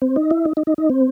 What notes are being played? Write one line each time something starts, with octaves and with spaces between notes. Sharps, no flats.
C4
D#4
E4
D#4
D#4
D#4
D#4
C4